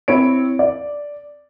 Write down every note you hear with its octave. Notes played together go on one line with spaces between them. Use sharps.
C4 E4 C#5 D7
D5